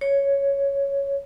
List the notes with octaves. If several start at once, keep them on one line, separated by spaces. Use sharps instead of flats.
C#5